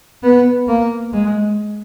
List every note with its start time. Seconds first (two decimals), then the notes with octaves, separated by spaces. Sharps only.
0.23 B3
0.68 A#3
1.13 G#3